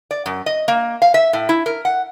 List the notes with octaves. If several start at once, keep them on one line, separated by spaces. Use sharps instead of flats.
D5
F#2
D#5
A#3
F5
E5
A2
E4
A#4
F#5